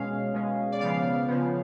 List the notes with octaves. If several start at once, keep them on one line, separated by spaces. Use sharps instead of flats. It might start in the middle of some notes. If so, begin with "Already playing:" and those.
Already playing: B2 G#3 C#4 F5
B2 G#3 C#4
D5
C#3 F3 B3 F5
C#3 F3 B3